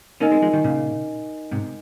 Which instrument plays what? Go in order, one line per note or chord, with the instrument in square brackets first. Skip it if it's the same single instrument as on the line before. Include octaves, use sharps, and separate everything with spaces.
[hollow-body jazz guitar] A#3 C#4 [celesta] D#4 A#4 D#5 G#5
[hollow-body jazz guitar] G#3 C4
F3 G#3
D#3 G3
A#2 C#3
G#2 C3